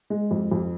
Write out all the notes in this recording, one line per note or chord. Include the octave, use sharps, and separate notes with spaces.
G#3
F2
F2